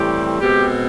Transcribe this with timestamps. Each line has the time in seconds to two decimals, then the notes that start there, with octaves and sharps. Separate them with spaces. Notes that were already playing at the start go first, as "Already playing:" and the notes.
Already playing: A2 E3 G3 C4 G4
0.40 B2 G#3 C4 G4